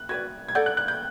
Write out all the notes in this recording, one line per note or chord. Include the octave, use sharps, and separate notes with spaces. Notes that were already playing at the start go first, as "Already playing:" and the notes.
Already playing: F#6
F#4 B4 D5 G#6
G#6
A4 D5 F#5 G6
F#6
F#6
G6